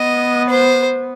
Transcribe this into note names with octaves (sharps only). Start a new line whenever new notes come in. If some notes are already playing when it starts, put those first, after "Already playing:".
Already playing: B3 D#5
C5